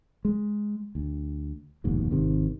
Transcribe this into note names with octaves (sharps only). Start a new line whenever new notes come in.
G#3
D2
F1 D#2 G#2 B2
G#1 C3 D#3